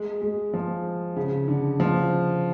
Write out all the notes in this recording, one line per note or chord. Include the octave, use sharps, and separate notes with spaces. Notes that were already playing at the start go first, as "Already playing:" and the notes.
Already playing: G#3
G#3
F3
C#3
D3
F3